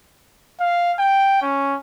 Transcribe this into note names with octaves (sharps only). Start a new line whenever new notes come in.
F5
G5
C#4